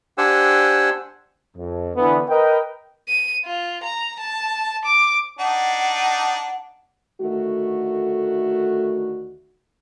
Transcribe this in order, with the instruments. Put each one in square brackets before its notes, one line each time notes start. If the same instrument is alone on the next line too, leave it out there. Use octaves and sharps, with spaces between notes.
[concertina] D4 G4 C5 F#5 G#5 E6
[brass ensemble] F2
D3 E3 B3
A#4 B4 D#5 G5
[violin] D#7
F4
A#5
A5
D6
[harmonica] D4 D#4 [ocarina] F#5
[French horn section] D2 D#3 A3 F#4